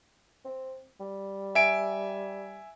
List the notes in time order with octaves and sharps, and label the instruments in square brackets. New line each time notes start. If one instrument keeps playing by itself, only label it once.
[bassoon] C4
G3
[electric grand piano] E5 G#5 D7